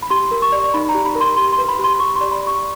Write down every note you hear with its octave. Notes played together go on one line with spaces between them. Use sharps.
B5
G4 C6
A#4
C#6
D5
D#4 B5
A#5
G4
B5
A#4
C6
G4 C6
C6
B4
B5
G4
C6
G4 C#6
C6
D5
B5
D5 C#6